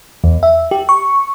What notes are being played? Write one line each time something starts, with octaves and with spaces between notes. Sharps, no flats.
E2
E5
G4
C#6